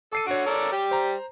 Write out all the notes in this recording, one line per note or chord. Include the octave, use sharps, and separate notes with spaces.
A4 D6 C7 D#7
D3 F#4 C#5 D7
A4 A#4 D5
G3 G4
C5 A#5